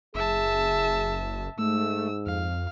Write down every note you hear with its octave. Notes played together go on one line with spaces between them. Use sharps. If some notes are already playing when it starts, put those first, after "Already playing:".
F#1 G#4 E5 A5
G#2 A3 E6
F2 F5